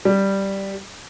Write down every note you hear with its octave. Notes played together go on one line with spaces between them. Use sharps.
G3